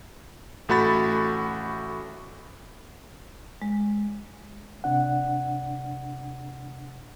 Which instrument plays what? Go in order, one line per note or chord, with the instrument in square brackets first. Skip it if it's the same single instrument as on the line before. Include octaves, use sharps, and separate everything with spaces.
[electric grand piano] A1 A3 F#4 B5 A6
[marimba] G#3
[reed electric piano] C3 D4 F#5